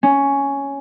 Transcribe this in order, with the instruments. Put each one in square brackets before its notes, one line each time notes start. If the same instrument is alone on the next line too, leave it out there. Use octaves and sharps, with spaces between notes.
[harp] C#4